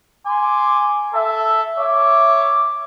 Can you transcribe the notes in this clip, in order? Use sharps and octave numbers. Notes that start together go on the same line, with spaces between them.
G#5 C6 D6
A4 E5
C#5 E5 D6